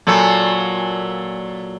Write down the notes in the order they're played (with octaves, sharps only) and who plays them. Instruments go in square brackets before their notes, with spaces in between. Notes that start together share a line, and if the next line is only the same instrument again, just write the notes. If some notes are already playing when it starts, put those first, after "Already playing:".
[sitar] A#2 F#3 A4